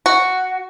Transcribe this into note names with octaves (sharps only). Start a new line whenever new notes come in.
F#4